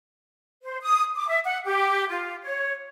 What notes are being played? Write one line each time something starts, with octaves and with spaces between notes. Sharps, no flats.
C5
D#6
D6
E5
F#5
G4
F4
C#5